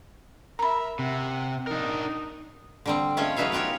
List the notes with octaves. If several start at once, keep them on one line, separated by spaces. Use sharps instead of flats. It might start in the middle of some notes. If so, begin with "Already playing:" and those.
A#4 E5 A#5 B5
C3 F#5
D4 D#4 A#4
D3 G3 C4
G#3 A3 C#4 F4 C#5
C#3 F#3 D#4 B4 E5 F5
B3 F4 G4 A#4 C#5